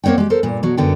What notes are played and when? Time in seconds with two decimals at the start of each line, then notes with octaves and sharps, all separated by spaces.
0.04 A#3 C4 C#5 F#5 G5
0.18 G#3 G4
0.30 A4 A#4 C5
0.43 G2 A#2
0.63 B2 F#3
0.77 F#2 D3 B3 G5